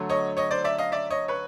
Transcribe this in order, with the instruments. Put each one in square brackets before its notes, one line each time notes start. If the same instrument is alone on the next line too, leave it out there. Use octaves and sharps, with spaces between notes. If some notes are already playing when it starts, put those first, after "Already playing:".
Already playing: [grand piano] D3 F#3 A3
C#5 D#5
C#5 D#5
C5 D5
D5 E5
D#5 F5
D5 E5
C#5 D#5
B4 C#5